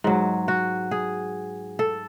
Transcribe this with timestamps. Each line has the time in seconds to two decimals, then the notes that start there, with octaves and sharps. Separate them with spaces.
0.04 G#2 F#3
0.48 F#4
0.91 G#4
1.79 A4